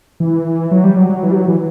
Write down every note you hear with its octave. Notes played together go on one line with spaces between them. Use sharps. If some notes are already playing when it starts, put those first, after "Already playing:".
E3
F#3
G3
F#3
F#3
E3
G3
F#3
E3